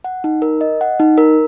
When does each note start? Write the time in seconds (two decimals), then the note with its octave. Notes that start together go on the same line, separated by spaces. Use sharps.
0.04 F#5
0.24 D#4
0.42 A#4
0.61 D#5
0.81 F#5
1.00 D#4
1.18 A#4